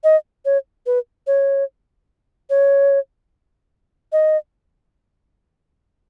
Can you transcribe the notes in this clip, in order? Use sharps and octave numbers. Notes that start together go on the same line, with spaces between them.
D#5
C#5
B4
C#5
C#5
D#5